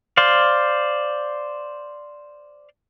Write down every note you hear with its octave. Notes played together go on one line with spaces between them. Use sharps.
C5 D5 F5